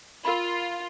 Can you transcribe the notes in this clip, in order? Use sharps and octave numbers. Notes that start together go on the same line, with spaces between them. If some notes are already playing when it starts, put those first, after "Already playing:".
F4 A#4 B5